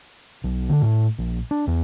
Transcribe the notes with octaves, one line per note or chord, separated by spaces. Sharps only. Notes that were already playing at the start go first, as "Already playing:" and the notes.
B1
D3
A2
A#1
D4
E2